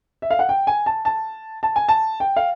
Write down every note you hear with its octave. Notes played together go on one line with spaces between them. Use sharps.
E5
F5
F#5
G5
G#5
A5
A5
A5
G#5
A5
G5
F5